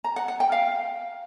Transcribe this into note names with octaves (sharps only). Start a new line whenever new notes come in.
A#5
F#5
F#5
G5
F5